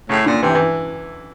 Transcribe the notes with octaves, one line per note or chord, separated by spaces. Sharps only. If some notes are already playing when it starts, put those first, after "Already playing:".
A2 C#3
A#2 D3
C3 E3
E3